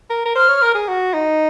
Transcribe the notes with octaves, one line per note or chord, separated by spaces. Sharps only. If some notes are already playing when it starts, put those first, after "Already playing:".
A#4
A#4
C5 F6
C#5
A#4
G#4
F#4
D#4